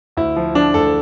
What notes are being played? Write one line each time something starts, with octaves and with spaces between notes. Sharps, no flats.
D2 E4
F3
F3 D4
D2 A4